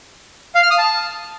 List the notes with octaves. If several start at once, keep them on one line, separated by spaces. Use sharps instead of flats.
F5
F6
D#6
A5